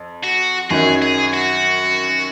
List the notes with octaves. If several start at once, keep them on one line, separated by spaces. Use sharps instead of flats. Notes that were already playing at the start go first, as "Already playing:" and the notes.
Already playing: F2
F#4
F#2 D#3 F#3 G#4
G#4
F#4